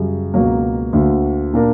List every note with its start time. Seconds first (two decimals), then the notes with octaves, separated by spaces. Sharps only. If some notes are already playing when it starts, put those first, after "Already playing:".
Already playing: F#2 C#3 G3
0.34 C#2 B2 F#3 A#3
0.93 D2 D3 A#3
1.53 A#2 A#3 D4 A#4